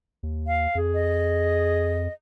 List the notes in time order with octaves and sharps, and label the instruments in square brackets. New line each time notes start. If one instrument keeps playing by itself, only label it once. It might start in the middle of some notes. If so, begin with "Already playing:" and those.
[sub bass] D#2
[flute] F5
[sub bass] F2 [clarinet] G#4
[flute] D#5